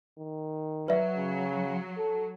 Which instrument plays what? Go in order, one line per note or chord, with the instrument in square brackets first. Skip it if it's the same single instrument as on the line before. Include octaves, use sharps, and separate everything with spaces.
[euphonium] D#3
[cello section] F#3 [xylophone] B4 D5 E5
[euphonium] C#3
A4